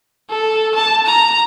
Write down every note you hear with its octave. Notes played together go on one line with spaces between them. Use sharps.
A4
A5
A#5